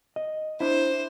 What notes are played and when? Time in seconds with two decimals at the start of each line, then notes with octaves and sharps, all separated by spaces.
0.16 D#5
0.60 D4 E4 C5